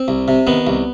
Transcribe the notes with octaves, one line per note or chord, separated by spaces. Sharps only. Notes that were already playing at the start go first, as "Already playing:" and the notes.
Already playing: C4
C2
C3
D#3 B3
C2